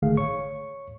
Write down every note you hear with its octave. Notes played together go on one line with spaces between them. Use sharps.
G#1 D3 D#3 A3 G#4 F5
C#5 C#6